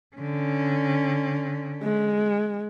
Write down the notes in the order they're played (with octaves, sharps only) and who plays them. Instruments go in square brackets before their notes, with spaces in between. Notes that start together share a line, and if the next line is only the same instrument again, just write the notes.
[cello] D3 C#4
[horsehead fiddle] G#3